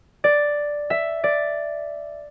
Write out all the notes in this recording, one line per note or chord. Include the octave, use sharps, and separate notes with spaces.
D5
E5
D5